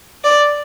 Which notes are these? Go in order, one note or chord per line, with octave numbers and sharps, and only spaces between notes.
D5